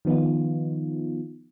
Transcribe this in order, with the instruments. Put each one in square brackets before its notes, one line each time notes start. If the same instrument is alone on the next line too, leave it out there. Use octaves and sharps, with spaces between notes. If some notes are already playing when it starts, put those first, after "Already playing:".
[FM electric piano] D#3 F3 B3 D#4 F4